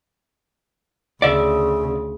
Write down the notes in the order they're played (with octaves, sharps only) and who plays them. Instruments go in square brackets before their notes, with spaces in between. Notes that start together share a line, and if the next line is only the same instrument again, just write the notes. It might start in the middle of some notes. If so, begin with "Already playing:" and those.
[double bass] D2 C#3 [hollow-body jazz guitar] D5 E5